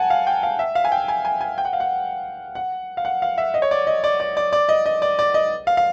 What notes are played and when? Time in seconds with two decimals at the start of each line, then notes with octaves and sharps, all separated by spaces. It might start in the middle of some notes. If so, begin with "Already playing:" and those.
Already playing: F#5 G#5 A5
0.10 F5
0.27 G5
0.43 F5
0.59 E5
0.75 F5
0.84 G#5
0.92 G5
1.08 G#5
1.25 G#5
1.41 G#5
1.58 G5
1.65 F#5
1.73 F5
1.80 F#5
2.55 F#5
2.97 F5
3.05 F#5
3.22 F5
3.38 E5
3.54 D#5
3.62 C#5
3.71 D5
3.87 D#5
4.04 D5
4.20 D5
4.37 D5
4.53 D5
4.69 D#5
4.86 D#5
5.02 D5
5.19 D5
5.34 D#5
5.67 F5
5.77 F5